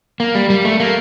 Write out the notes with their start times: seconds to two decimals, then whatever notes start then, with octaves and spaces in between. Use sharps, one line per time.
0.20 A#3
0.35 G3
0.50 G3
0.65 A3
0.80 A#3